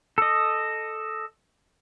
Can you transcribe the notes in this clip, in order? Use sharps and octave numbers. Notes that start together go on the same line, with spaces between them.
A4 D#5